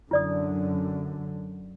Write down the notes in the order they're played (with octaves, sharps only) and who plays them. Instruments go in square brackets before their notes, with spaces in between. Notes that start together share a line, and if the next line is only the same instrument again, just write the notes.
[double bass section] F#2 D3 [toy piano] E4 D5 D#6